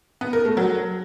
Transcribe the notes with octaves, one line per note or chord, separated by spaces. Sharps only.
B3
A#4
A3
F#3